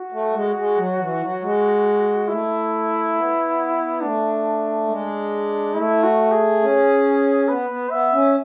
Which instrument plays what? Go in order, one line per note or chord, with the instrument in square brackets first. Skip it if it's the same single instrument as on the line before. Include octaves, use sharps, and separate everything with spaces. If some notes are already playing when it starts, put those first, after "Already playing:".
Already playing: [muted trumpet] F#4
[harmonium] A3
G#3
G#3
F#3
E3
F#3
G#3
[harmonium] A3 [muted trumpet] E4
[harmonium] B3
[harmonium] A3 [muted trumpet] D4
[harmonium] G#3
[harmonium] A3 [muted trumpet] E4
[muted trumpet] F#4
G#4
[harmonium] C#4
[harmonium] B3 [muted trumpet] B4
[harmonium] B3
[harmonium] B3 [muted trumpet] E5
[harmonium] C#4